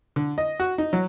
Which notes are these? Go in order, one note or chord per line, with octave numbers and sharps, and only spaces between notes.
D3
D#5
F#4
D#4
F#3